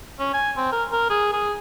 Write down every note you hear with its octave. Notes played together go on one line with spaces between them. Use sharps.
C#4
G#5
C4
A#4
A#4
G#4
G#4